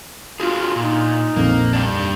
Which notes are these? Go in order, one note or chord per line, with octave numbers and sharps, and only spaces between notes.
D4 F4 F#4 G#4
A#2 D#4
A#1 F2 A#3
G3 D4